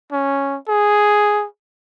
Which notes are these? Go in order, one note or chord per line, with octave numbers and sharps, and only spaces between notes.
C#4
G#4